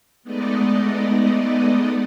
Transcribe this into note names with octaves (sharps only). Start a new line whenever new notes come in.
G#3 A3 B3 D#4 D5 D#5